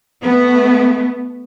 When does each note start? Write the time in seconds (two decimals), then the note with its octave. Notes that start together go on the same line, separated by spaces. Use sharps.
0.21 A3 B3